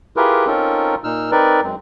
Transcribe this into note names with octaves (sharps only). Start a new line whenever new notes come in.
E4 F4 G4 G#4 A#4 B4
C4 C#4 D#4 F4 A4 A#4
A#2 D#4 E6 F6
C4 D#4 A#4 B4 D5
F#2 G#3 C4